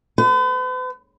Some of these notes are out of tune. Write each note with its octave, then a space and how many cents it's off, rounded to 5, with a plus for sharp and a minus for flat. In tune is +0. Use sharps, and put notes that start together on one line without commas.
B4 +45